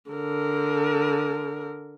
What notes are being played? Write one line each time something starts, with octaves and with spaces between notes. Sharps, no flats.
D3 A#4